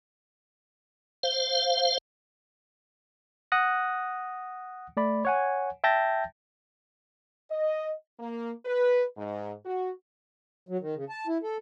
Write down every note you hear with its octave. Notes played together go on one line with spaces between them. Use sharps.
C5 F5
F#5 D#6 F#6 A#6
A3 D5 B5
C#5 F#5 G#5
E5 G5 A5 G6 A6 A#6
D#5
A#3
B4
G#2
F#4
F#3
D#3
C#3
A5
E4
A4